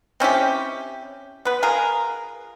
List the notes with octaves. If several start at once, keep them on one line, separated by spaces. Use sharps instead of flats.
C4 C#4 E4 G4
B3 B4
F4 G#4 A#4